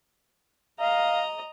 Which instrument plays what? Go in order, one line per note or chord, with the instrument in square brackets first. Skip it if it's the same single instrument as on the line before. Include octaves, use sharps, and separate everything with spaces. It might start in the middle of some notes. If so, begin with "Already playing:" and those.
[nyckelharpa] D#5 A#5 [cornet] F5